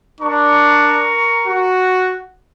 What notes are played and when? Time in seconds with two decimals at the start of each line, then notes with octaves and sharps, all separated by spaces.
0.21 D4 A#4 A#5 C#6
1.47 F#4